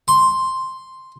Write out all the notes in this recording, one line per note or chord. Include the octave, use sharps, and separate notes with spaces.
C6